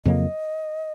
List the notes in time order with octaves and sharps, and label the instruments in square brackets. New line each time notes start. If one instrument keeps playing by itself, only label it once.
[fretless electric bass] F2 C#3 F#3 A#3 [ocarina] D#5